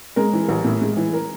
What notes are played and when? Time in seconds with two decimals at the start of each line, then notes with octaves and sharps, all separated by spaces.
0.16 G#3 A#4
0.33 E3
0.49 A1
0.64 A2
0.81 G#3
0.97 E3
1.13 A#4